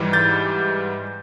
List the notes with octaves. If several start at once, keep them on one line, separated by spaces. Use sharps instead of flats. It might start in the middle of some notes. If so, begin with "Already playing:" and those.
Already playing: G#2 E3 G3
G6 A6